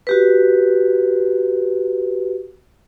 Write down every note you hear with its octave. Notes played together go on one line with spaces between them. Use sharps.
F#4 G4 B4